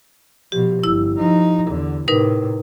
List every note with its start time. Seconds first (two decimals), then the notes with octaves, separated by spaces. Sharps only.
0.52 B2 F3 G4
0.83 G1 E4 E6
1.18 F3 D#4
1.68 E2 D3
2.08 A2 C3 D#4 A#4 B4